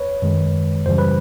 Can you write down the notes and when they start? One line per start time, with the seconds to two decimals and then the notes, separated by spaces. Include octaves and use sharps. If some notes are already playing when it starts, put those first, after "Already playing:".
Already playing: B4 C#5
0.22 F#2 D#3 G#3
0.86 F#2 C#3 E3 G3 C5
0.98 B4